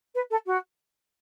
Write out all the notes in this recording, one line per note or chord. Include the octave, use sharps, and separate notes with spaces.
B4
A4
F#4